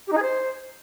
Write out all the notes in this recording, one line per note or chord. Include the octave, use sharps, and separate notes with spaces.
G4
D#4
G#4
C5